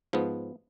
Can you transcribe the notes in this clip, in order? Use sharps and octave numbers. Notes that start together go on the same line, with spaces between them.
G#2 F3 B3